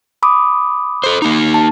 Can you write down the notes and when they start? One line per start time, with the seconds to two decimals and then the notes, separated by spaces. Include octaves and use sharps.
0.23 B5 D6 D#6
1.04 A4 C5
1.22 A#3 D#4
1.54 A5